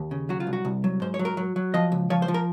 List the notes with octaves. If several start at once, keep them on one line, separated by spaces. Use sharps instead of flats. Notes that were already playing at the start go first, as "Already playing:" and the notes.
Already playing: D#2
C#3
F#3 F#4
F4
C2
F#4
C2
F#3
G#2 C5
C#5
F#3
A#4
F#3
F#3
F3 D#5
C#2
F3 C#5
C5
F3
A#4